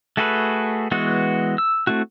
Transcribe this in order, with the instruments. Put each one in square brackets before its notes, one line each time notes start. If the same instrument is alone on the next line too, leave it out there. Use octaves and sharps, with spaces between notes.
[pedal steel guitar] A3 F#4 G#4 A4 B4
E3 G#3 B3 F#4
E6
A3 C4 E4 F#4